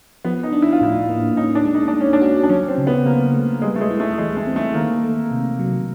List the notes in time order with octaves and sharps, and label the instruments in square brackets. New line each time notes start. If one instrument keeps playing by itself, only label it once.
[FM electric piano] F3 [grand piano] B3
[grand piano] D#4
[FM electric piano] D4
[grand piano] E4
F4
[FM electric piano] A2 [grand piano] E4
[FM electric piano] A#3
[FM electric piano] C#4 [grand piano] D#4
[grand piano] D4
[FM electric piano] G#3
[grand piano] D#4
D4
[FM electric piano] G#3
[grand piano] C#4
D4
[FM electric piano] F#4
[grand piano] D4
[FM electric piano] F#3 [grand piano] C#4
[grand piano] C4
[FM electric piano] C#3
[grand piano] B3
[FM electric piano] C#3 [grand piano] A#3
[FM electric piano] A3
[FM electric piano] G3 [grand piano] G#3
[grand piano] A3
G#3
[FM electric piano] E4
[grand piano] A3
[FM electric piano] E3 [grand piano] G#3
[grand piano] A3
[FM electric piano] C4
[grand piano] A3
[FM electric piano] D#3 [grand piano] A#3
[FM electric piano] A3
C3
F#3